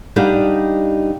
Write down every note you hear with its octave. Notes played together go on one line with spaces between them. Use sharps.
G3 D4 D#4 G4 F5 F#5